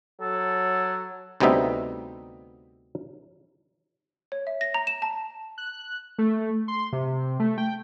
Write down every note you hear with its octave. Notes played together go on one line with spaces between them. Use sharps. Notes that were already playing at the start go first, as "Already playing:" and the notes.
F#3 A4
D2 C3 G3 B3 D#4 E5
C#5
E5
A#6
A#5
E7
A5
F#6
A3
C6
C3
A3
G5